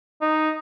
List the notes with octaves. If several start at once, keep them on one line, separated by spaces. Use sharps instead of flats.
D#4